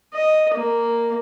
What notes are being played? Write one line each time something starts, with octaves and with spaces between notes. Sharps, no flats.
D#5
A#3